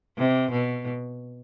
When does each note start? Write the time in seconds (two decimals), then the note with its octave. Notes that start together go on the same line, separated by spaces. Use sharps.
0.18 C3
0.51 B2